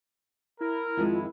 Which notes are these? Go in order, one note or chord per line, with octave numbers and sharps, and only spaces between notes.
E4 A#4
F2 D#3 G#3 F4